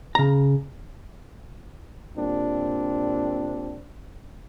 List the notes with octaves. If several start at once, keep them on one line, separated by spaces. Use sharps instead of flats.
C#3 A#5
A#2 G3 C4 D4